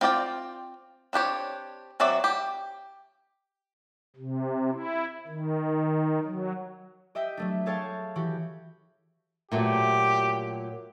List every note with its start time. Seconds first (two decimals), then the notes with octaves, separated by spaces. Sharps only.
0.01 C4 F4 D5 D#5 G5
1.13 C4 D4 G4 C#5
2.00 F#3 C4 F#4 D5 E5
2.24 G4
4.16 C3
4.70 E4
5.28 D#3
6.24 F#3
7.15 G4 D#5 E5 G5
7.37 F#3 A3 D4
7.66 G#4 A4 C#5 F5 G5 A5
8.15 E3 F#4 G4
9.52 A#2 F#3 A3 G4